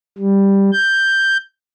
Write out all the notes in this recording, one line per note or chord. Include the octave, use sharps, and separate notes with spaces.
G3
G6